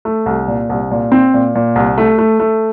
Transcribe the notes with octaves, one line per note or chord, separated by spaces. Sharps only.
A3
C2
A#2
C2
A#2
C4
A#2
A#2
C2
A3
A3
A3